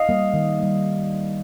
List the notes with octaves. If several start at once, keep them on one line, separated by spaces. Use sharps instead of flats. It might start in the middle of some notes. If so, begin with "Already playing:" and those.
Already playing: D#5 F5
G3 A#3
D#3
G3 A#3